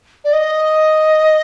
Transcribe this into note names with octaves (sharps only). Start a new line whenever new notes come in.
D5
D#5